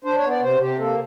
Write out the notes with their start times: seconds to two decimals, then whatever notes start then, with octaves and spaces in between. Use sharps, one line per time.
0.04 D4 C5
0.17 C#5
0.23 B3
0.30 D5
0.42 C3 C5
0.60 C3 G4
0.79 A#3 A4